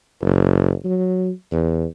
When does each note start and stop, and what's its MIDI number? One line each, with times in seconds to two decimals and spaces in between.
0.21 0.73 30
0.85 1.31 54
1.52 1.85 40